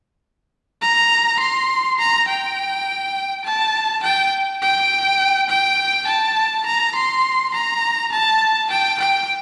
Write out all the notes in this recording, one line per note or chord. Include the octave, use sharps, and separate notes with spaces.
A#5
C6
A#5
G5
A5
G5
G5
G5
A5
A#5
C6
A#5
A5
G5
G5